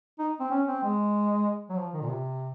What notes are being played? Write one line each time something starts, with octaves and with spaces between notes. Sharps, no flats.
D#4
C4
C#4
C4
G#3
F#3
F3
D#3
A#2
C3